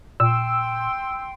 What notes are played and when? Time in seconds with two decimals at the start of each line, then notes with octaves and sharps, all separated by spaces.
0.20 A#2 G5 C6 E6